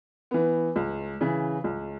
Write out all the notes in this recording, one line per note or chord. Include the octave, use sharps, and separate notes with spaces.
E3 B3
C#2
C#3 E3
C#2